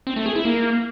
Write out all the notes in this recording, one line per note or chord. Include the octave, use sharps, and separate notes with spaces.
C4
A3
G#4
E4
A#3